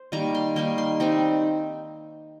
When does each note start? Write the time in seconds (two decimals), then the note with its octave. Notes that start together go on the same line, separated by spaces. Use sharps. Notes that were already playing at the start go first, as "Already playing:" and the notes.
Already playing: C5
0.12 D#3 G3 A#3 A#5
0.35 C6
0.56 D#3 G3 A#3 C6
0.78 C6
1.00 G3 C4 D#4 C6